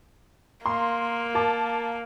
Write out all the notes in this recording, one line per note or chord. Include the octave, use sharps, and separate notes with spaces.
A#3 C6
A#4 A5 D6